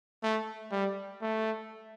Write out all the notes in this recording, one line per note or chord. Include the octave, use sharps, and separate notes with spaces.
A3
G3
A3